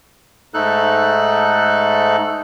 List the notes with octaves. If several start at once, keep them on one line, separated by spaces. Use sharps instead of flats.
G#2 A3 D#4 A4 F#6